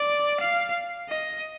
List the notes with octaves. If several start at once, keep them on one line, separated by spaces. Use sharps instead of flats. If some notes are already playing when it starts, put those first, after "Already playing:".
Already playing: D5
F5
D#5